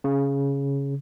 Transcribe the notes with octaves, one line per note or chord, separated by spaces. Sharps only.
C#3